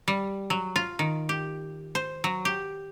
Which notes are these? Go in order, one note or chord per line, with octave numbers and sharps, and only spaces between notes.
G3
F#3
F4
D#3
G4
C5
F#3
G4